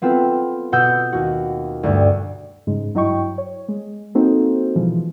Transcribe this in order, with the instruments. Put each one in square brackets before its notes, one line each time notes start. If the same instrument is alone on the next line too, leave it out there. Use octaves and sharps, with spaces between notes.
[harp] B3 C4 F4 A4 B4
B2 F#5 D#6 E6 G6
D#2 F#4
D2 G2
[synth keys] G#2 C#3 G#3
G2 F#3 E4 D#5 G5 C#6
C#5
G#3
A#3 C4 D#4 F#4 A4 C5
B2 E3 F3 G#3